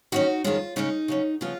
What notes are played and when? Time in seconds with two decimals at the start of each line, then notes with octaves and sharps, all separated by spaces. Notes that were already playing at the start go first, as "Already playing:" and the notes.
0.12 F#2 D#3 A#3 C#4 D#4 F#4
0.44 F2 D#3 G#3 C#4 F4
0.76 C#3 G#3 C#4 D#4
1.08 C#3 F#3 C#4
1.41 C#3 F3 B3 F4